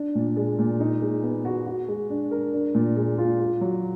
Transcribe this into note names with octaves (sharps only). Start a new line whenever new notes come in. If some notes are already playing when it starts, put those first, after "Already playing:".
Already playing: D4
A#2
G#3
A#2
D#4
G#3
B3
F#4
F#4
G#3
D4
A#4
D4
A#2
G#3
F4
F4
F#3